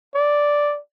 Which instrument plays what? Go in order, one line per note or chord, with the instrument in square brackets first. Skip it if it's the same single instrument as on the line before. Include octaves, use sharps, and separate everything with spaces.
[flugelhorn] D5